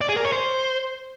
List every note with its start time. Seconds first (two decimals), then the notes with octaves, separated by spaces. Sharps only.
0.01 D5
0.09 G#4
0.17 A#4
0.25 C#5
0.32 C5